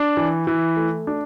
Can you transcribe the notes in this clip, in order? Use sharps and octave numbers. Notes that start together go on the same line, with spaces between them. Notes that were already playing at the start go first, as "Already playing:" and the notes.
Already playing: D4
E3
E3
A3
D4